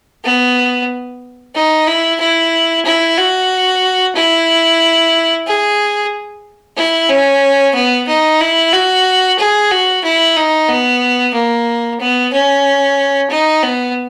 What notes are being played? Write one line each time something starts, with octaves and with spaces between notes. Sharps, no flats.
B3
D#4
E4
E4
E4
F#4
E4
G#4
E4
C#4
B3
D#4
E4
F#4
G#4
F#4
E4
D#4
B3
A#3
B3
C#4
D#4
B3